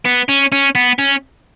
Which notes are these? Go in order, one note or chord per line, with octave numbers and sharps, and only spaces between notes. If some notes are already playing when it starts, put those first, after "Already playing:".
B3
C#4
C#4
B3
C#4